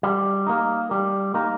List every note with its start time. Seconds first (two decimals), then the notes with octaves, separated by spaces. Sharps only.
0.03 G3
0.47 A#3 D#4
0.91 G3
1.34 A#3 D#4